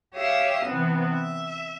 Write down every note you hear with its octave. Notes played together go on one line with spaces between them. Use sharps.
G4 C#5 E5 F5 D#6 E6
C3 E3 B3 C4
E5